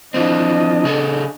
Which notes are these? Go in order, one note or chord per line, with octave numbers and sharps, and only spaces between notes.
E3 F3 C4 D4 D#5
C#3 G#4 A4